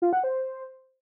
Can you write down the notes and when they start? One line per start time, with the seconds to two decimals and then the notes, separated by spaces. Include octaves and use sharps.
0.02 F4
0.13 F#5
0.24 C5